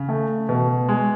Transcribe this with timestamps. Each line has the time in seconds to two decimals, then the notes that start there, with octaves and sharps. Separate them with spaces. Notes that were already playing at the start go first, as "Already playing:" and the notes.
Already playing: C#3
0.09 A3
0.49 B2
0.89 G#3